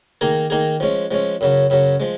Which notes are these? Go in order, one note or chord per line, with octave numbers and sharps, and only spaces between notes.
D#3 A#3 D#4 G#4
D#3 A#3 D#4 G#4
F3 G#3 C#4
F3 G#3 C#4
F#2 C#3 F#3
F#2 C#3 F#3
F3 G#3